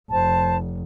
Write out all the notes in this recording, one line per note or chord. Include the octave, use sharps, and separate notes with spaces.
F1 C5 A5